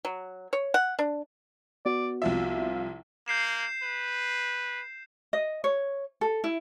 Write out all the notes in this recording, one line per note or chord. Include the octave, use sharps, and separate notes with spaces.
F#3
C#5
F#5
D4
B3 F#4 D5
C2 F3 F4 E5
A#3 G6 C7 E7
B4
D#5
C#5
A4
E4